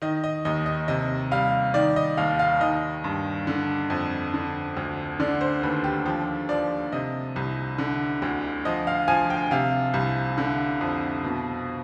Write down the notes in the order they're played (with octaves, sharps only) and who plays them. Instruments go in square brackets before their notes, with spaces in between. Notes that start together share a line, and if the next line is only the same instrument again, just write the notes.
[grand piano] D#3 D#5
D#5
D#2 D#5
D#5
C3 D#5
G3 F5
D#3 D5
D#5
D#2 F5
F5
D#3 D#5
G2
D3
F2
D3
D2
D3 D5
C5
D#2 B4
G4
F3 G4
F3 D5
C3 D#5
C2
D3
D2
F3 D#5
F5
F3 G#5
G5
C3 F5
C2
D3
F2
B2